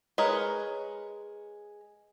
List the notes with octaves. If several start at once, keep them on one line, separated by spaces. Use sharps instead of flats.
G#3 A#4 B4 C#5